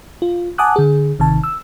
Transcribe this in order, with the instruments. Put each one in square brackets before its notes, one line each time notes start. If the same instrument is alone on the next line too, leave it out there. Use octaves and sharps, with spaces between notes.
[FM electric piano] F4
F#5 G#5 A5 D6 D#6 F#6
D3 G#4
G#1 C3 D#3 A5
E6